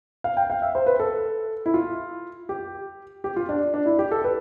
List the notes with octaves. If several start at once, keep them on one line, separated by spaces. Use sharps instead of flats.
F5
G5
F5
E5
C5
B4
A4
E4
F4
G4
G4
F4
D4
D4
E4
G4
A4
B4